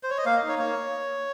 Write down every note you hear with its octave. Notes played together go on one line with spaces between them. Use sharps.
C5
C#5
D#5
A#3 F5
D#5
D#4
C#5
A#3 C#5